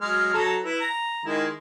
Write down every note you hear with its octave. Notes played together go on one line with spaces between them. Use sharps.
F#3 G#3 F6
F#3 A4 A#5
E4 B4
A#5
D#3 G#3 E4